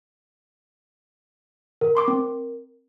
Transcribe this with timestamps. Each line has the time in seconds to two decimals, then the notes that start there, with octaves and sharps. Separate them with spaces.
1.81 A#4
1.95 B5 C6 D6
2.08 C4